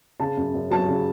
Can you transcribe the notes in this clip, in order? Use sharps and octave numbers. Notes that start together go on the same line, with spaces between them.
C#3 A5
F#2
F#2
F#3 A5
C#3